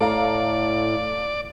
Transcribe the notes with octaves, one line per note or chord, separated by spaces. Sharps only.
A2 A4 D5 F5 A#5